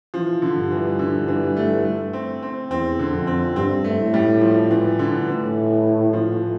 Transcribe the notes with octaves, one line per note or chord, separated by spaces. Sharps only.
E3 F3
D3
G2
E3
D3
E3
A3
A3
C4
C4
E2 C4
D3
F2
C4
G2 C4
A3
A2
G3
F3
E3
D3
A2 E3
F3